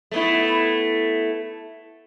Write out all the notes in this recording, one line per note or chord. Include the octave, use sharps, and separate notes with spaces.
A3 B3 E4